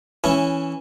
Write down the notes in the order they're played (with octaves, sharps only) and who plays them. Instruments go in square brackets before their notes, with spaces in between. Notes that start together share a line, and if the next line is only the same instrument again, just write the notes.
[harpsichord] E3 C#4 E4